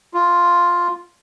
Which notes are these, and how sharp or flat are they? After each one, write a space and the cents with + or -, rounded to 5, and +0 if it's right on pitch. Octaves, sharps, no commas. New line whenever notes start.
F4 +0